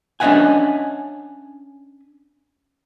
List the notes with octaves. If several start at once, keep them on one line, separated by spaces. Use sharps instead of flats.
C#4 D4 D#5 E5 F#5 G#5